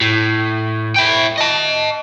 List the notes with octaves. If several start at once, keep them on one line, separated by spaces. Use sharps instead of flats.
A2
E4 G5
D#5 A5